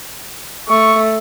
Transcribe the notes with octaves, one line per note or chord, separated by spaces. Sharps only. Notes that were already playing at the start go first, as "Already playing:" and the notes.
A3 C#6